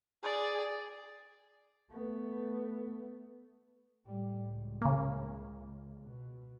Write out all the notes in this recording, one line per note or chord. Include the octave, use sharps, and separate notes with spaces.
G#4 D5
A3 B3
A2 G3
C#2
C#3 A#3
B2